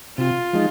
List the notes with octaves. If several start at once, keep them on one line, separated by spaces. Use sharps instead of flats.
C3 F4
F3 G#3 D#4